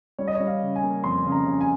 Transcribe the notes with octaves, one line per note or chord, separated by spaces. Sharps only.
G3 C#5
D#5
C#5
G3
F5
C#3
G#5
A#3
F2 C6
C#3
A#5
C#3
G#5